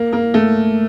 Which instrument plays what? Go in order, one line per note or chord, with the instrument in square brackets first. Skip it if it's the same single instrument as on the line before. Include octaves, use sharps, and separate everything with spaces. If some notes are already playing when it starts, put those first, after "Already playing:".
Already playing: [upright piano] A#3
A#3
A3